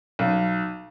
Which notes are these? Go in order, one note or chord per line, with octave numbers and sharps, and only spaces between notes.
B1